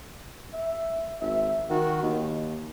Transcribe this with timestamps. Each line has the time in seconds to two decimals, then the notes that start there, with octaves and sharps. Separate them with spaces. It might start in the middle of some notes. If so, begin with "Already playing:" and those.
0.53 E5
1.21 G#1 E5
1.70 D#3 F#4
2.03 D#2 D#5